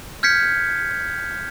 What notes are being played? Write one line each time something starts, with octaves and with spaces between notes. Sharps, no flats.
F6 G6 G#6 B6 C#7